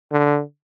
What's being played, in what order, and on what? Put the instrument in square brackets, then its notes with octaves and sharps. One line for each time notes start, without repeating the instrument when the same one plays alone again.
[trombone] D3